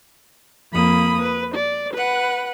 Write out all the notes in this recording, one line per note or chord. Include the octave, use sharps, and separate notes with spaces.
F2 A#3 B5 D#6
B4
D5
B4 F#5